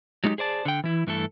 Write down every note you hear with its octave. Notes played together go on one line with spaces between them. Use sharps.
F#3 G#3 D#4 F4 G4
G#4 C5 D5 A5
D3 G5
E3 E4
G2 E3 A3 A4